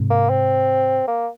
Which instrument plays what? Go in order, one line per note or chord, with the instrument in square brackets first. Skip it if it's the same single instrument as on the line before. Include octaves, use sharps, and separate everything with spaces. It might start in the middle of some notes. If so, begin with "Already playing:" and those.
Already playing: [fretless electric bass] G#2 C3
[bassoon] A#3
C4
A#3